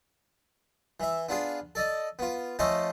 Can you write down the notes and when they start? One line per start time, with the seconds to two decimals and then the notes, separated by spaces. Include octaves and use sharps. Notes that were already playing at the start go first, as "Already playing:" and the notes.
1.00 E3 E5
1.29 B3 D4 F4 G#4
1.75 A4 D5 D#5
2.19 B3 F4
2.59 F3 A3 C#4 A4 C5 D#5